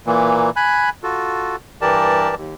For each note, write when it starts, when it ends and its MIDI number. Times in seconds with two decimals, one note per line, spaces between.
0.06 0.50 46
0.06 0.50 52
0.06 0.50 58
0.56 0.90 80
0.56 0.90 83
0.56 0.90 90
1.03 1.56 65
1.03 1.56 66
1.03 1.56 69
1.81 2.35 43
1.81 2.35 52
1.81 2.35 67
1.81 2.35 70
1.81 2.35 74
1.81 2.35 81
2.36 2.55 39